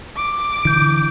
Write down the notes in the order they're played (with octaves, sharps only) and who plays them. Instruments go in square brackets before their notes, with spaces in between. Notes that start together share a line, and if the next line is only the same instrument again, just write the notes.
[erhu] D6
[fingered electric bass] D3 E3 [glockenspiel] G6 D7